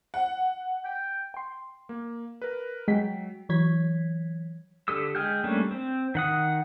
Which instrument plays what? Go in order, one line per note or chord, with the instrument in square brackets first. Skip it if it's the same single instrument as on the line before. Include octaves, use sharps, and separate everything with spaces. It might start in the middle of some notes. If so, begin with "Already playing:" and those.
[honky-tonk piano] F#5
[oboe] G5
[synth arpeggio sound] G5 C6
[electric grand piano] A#3
A#4 B4
[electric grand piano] F#3 [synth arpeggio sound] G#3 G5 B6
[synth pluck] E3 F#3 C#5 G#6 B6
[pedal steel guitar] D3 G4 A4 D#6 E6
G#3 G#4 G5 F6 G6
G3 A3 A#3 C#4 D4
C4
D#3 F#5 D#6